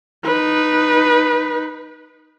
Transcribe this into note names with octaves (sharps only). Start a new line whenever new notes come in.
D#4 B4